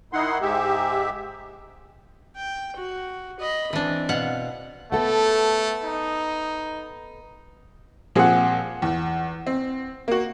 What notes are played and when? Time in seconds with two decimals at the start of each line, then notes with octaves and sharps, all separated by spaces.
0.13 D#3 D#4 E4 F#5 C6
0.41 G#2 G#3 G4 E5
2.36 G5
2.76 F#4
3.39 D#5 B5
3.73 E3 C4 D4
4.09 B2 F5 F#5
4.92 A3 B3 A4 F#5
5.84 D#4
8.16 A#2 F3 C4 G#4 F#5
8.82 E2
9.47 C4
10.08 A#3 F#4